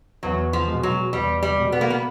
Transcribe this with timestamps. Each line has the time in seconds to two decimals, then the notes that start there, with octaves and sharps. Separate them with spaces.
0.23 E2 F#3
0.53 F3
0.68 B2 G#3
0.83 F#3
1.13 E2 G3
1.43 G3
1.57 B2 G#3
1.72 B3
1.81 A#3
1.90 B3